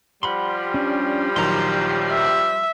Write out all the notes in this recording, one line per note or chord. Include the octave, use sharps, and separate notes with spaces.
F3 G3 F#5 B5 C6
C#4 D4
A#1 D#3 F#3 A#5 C6
E5